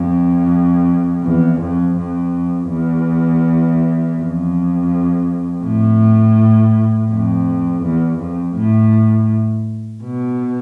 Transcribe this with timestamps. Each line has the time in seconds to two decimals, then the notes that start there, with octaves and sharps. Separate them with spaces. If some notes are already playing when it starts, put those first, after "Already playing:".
Already playing: F2
1.23 E2
1.59 F2
1.96 F2
2.70 E2
4.17 F2
5.63 A2
7.10 F2
7.83 E2
8.19 F2
8.56 A2
10.03 B2